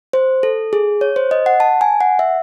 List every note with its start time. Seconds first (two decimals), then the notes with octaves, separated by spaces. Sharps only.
0.13 C5
0.43 A4
0.73 G#4
1.01 C#5
1.16 C5
1.31 D#5
1.46 F#5
1.60 A5
1.81 G#5
2.01 F#5
2.19 E5